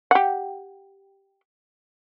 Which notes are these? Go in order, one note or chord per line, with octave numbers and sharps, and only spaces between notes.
G4 F#5